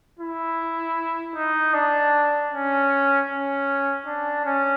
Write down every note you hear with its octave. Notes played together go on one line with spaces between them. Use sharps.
E4
D#4
D4
C#4
C#4
D4
C#4